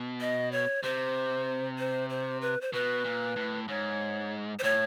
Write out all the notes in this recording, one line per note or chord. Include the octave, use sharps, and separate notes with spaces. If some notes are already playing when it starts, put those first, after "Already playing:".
Already playing: B2
D#5
C#5
C3 C5
C5
C5
B4
C5
B2 B4
A#2
A2
G#2 C#5
C5
A2 C#5